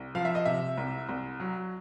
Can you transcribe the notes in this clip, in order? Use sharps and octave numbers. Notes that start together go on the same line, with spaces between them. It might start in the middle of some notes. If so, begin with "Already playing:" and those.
Already playing: C2
F3 F5
E5
D#5
C3 E5
C2
C2
F#3